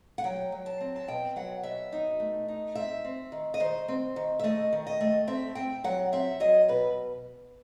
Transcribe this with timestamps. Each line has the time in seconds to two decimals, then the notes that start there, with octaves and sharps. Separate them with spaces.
0.18 F#5
0.24 F#3 G5
0.52 F#3
0.66 A5
0.81 C4
0.96 A5
1.08 B2 G5
1.36 F#3 F#5
1.63 B2 E5
1.92 D#4
2.20 A3
2.48 D#4
2.75 C4 E5
3.05 C4
3.32 D#3
3.54 D#5
3.60 D#3 C5
3.88 C4
4.16 D#3
4.39 E5
4.44 A3 D#5
4.73 D#3
4.87 D#5
5.00 A3
5.28 C4 E5
5.55 C4 G5
5.84 F#3 F#5
6.12 C4 E5
6.40 F#3 D#5
6.68 B2 B4